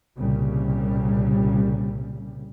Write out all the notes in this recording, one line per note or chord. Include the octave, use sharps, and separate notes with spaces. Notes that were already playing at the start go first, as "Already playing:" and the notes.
C2 A#2 C#3 G3